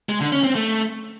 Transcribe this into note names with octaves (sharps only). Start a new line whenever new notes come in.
G#3
D3
C#4
C4
A3